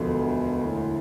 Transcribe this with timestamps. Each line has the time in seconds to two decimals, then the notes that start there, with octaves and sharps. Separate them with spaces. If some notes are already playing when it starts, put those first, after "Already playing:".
Already playing: E1 D2 B2 D3 F3
0.64 A2